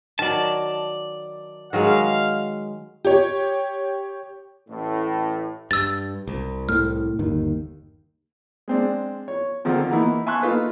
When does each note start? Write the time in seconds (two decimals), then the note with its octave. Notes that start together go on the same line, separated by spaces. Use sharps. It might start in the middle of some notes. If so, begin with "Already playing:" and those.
0.19 D#3 F#3 D5 A5
1.73 D#3 F#3 G#3 F5
3.05 G4 C#5
4.68 A1 A2
5.71 G2 E6 A6
6.27 C2
6.69 A2 F6
7.19 G1 D#2 D#3
8.68 G#3 C4 D4
9.28 C#5
9.65 D3 D#3 F3 C4
9.90 E3 A#3 B3 D#4 E4
10.26 E5 G#5 A5 C6 C#6 F#6
10.43 A#3 D#4 F4 A4 B4